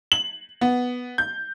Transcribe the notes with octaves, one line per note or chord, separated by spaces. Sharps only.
F#7
B3
G6